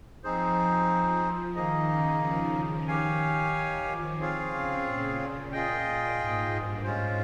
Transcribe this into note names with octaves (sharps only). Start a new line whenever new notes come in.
F3 C4 D#4 G#4 C5
D#3 A#3 D#4 G#4 D#5
C#3
F3
D#3
D#3 G4 C#5 F5 G#5
D#3
F3
C4 F4 G#4 C#5 F5
C#3
A#2
F4 G#4 D#5 G5
G#2
G2
G#2 G#3 C#4 F4 C5